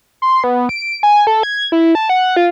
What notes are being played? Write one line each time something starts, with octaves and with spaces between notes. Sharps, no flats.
C6
B3
D7
G#5
A4
G#6
E4
A5
F#5
F4